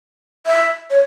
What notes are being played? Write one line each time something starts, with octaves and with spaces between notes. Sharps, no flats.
E5
C#5